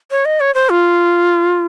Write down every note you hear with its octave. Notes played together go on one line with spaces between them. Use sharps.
C#5
D#5
C#5
C5
F4